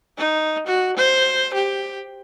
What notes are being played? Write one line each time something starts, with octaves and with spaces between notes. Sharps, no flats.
D#4
F#4
C5
G4